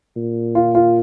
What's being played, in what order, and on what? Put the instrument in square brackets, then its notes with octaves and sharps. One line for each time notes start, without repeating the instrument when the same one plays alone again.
[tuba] A#2
[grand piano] F4
F4